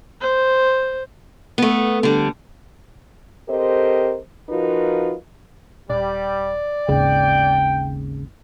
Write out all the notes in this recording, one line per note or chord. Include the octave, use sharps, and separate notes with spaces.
C5
A3 B3
D3 G3
C4 G4 A4 A#4 C5 D#5
F3 D#4 F4 F#4 A#4 B4
D#1 G3 D5
G#1 D#2 C#3 G5